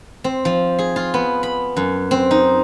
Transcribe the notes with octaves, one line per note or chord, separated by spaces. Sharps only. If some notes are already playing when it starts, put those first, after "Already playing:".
C4
F3
G#4
F4
B3
B5
F#2
C4
D#4